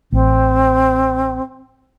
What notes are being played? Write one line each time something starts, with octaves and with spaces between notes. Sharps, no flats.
A1 C4